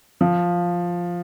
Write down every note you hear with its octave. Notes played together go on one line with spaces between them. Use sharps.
F3